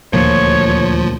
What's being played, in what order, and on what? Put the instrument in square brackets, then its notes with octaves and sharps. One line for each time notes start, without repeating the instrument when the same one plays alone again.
[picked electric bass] D#1 D2 A#2 [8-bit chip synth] F3 [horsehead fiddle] C#5